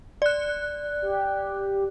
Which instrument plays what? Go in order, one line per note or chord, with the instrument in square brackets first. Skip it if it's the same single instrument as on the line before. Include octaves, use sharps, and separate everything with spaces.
[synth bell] D5 F#6
[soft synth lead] G4